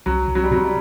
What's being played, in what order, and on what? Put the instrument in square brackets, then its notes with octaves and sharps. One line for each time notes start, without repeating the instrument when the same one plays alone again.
[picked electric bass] C2 [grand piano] F#3
[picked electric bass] C2
[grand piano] F#3
G3
[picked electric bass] C3 [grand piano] F#3
[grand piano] G3